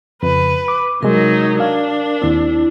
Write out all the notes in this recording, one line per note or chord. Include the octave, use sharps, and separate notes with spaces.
F2 C#3 B4
D6
C3 F#3 G#3 D#4 A#4
D4 F5
D#2 C4 E4